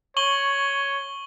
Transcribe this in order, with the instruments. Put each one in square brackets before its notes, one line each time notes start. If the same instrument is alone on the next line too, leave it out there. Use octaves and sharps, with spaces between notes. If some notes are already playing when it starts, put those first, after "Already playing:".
[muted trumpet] C#5 [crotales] C#6 F#7 G7